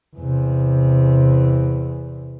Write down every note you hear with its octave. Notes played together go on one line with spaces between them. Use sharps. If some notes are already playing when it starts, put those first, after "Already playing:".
E2 C3